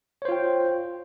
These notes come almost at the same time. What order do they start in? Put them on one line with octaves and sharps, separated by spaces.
C#5 C5 F4 G5